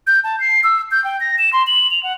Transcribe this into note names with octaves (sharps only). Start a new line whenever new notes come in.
G6
A5
C7
E6
G6
G5
A#6
E7
C6
F#7
F7
F#5